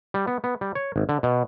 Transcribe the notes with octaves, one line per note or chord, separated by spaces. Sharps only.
G3
B3
B3
G3
C#5
G#1
D3
B2